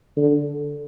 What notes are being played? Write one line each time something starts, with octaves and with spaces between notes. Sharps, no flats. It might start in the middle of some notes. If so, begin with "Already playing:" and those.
D3